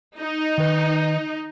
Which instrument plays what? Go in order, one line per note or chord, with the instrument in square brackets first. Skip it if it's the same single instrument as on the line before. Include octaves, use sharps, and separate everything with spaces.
[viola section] D#4
[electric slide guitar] D#3 B4